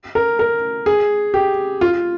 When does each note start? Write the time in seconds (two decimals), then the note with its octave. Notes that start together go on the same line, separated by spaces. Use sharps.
0.15 A#4
0.39 A#4
0.86 G#4
1.34 G4
1.81 F4